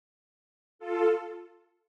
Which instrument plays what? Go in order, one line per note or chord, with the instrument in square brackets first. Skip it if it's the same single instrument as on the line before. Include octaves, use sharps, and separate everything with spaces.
[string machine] F4 A4